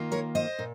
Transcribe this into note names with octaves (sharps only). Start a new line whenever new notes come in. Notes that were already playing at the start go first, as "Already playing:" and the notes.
Already playing: D#3 A#3 F4
A#4 C#5
C5 D#5
A#2